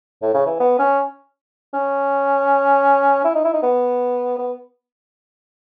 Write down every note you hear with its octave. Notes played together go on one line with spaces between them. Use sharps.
A2
C#3
E3
B3
C#4
C#4
E4
D#4
E4
D#4
B3
B3